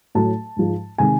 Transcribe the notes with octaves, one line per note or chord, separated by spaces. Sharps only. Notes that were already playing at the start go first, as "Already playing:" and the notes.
A2 F#3 A3 A5
G#2 F3 G#3
C3 D#3 G#3 G#5